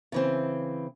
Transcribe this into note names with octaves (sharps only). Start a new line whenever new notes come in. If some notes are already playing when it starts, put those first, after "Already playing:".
C#3 E3 C4